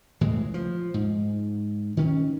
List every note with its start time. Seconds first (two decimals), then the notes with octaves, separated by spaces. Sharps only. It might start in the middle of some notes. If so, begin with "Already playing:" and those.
0.21 C#2 A2 E3 G#3
0.54 F3
0.94 G#2
1.97 D#3 C#4